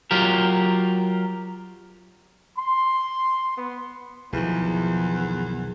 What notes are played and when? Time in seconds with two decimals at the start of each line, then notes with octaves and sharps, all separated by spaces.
0.11 F#3 F4 G4 A#4
2.57 C6
3.57 B3
4.33 B1 E2 D#3 F3